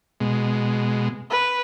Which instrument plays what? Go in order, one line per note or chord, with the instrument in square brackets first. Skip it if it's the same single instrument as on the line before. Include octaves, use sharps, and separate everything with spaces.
[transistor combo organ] B2 G#3
[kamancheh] B4